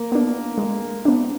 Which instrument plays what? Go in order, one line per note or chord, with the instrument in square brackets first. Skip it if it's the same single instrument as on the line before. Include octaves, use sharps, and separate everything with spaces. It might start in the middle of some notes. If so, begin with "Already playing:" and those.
Already playing: [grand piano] A#3
[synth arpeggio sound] B3 D4
G#3
B3 D4